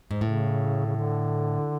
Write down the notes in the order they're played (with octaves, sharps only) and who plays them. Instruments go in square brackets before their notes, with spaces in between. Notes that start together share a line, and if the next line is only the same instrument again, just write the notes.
[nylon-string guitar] G#2
[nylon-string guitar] A2 [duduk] C#3
[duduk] C#3
D3